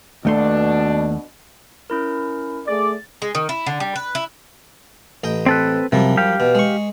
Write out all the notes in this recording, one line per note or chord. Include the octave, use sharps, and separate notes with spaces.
D#2 B2 A3 D4 C6
C#4 E4 A#4
A3 G#4 D5 A6
G#3
D#3
E4
D3
G3
B4
E4
A1 D#5 G5
C4 A4 B4
F#2 C3 F3 G3
G4 F5
B2
G#3 C#6